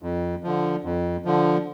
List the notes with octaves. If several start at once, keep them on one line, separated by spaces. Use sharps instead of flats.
F2
D3 F3
F2
D3 F3